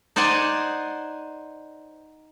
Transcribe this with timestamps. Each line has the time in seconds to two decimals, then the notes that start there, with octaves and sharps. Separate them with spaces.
0.16 D#4 C5 D5 F#5 G#5